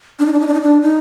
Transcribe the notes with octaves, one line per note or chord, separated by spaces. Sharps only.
D4
D#4
D4
D#4
D4
D#4
D4
D#4